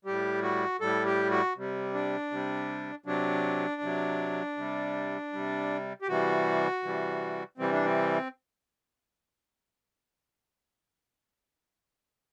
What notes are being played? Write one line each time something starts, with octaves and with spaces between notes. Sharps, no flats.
A2 G3 G4
F#4
A2 G3 A4
G4
F#4
C3 G3
D4
C3 G3
C3 F#3 D4
C3 F#3
C3 G3
C3 G3
G4
C3 E3 G3 F#4
C3 E3 G3
C3 E3 G3 C4
D4
C4